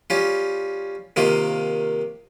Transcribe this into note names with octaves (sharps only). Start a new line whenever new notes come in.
G3 C#4 F4
C3 D#3 A#3 F4